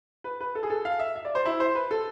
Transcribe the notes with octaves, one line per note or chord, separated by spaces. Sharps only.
B4
B4
A4
G#4
A4
F5
E5
E5
D5
C5
E4
C5
B4
A4